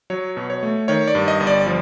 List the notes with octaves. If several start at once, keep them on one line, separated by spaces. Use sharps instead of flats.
F#3 C#5
B2
C#5
A3
D#3 C#5
D5
G2
D#5
G1
D5
F3